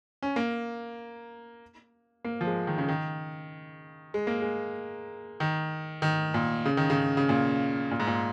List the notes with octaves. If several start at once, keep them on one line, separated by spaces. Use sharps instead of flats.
C#4
A#3
A#3
F3
G#3
D#3
C#3
D#3
G#3
A#3
G#3
D#3
D#3
A#2
C#3
D#3
C#3
C#3
A#2
A#2
G#2
A#2